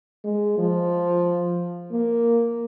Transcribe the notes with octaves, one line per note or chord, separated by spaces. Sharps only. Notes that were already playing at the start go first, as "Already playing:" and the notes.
G#3
F3
A#3